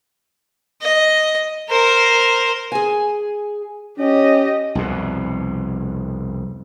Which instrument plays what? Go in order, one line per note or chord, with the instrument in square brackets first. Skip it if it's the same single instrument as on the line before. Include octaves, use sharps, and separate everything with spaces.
[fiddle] D#5
A#4 C5
[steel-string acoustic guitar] G#4 G#5
[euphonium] C#4 [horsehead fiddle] G4 D#5
[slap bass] C2 F2 B2